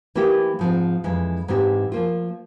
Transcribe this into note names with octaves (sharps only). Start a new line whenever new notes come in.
E3 A#3 E4 G4
G#2 F3 G#3 C4
F2 E3 G#3 E4
G#2 E3 G#3 C4 G4
F3 A#3 F4